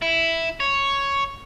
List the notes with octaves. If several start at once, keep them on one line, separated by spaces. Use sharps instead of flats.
E4
C#5